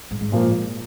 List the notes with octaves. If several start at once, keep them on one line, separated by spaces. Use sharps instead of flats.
G#2
G#2
A#2 F3 A#3